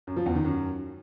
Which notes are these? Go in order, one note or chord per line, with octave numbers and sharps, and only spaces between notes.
F#2
F3
E2
D#3
F#2